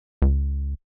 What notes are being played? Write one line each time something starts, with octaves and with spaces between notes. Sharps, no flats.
C#2